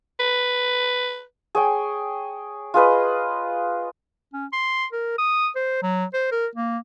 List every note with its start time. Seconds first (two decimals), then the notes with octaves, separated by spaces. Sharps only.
0.19 B4
1.55 G#4 C#5 G5
2.74 F4 G#4 B4 D#5
4.33 C#4
4.53 C6
4.93 A#4
5.18 D#6
5.56 C5
5.83 F#3
6.14 C5
6.32 A#4
6.56 A#3